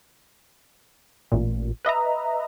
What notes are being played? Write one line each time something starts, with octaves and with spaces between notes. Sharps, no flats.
A1 A#2
B4 D#5 E5 A#5